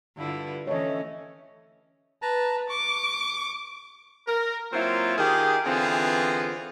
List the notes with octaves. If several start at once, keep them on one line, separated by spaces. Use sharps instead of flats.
G2 D3 E4 F4
E3 A3 C#4 C#5 D#5
B4 A5 A#5
C#6 D6
A#4
F#3 A#3 C4 E4 F4
D#3 D#4 F4 G4 G#4
D3 E3 B3 C4 F4 G#4